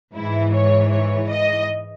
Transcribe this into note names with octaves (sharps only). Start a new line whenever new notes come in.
G#2 E3 E4
C#5
C#5
D#5